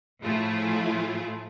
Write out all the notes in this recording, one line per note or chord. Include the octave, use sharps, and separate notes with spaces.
A2 F3 A3 E4 F4 G#4